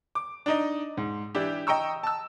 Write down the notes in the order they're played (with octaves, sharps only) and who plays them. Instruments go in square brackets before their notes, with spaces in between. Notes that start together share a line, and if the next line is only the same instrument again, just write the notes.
[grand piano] D6
D4 D#4 D#5
G#2
E3 D4 E4 G4
D#5 G5 A#5 C#6 E6
A5 E6